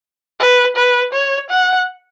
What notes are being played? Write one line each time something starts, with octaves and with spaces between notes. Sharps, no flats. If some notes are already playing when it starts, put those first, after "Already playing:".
B4
B4
C#5
F#5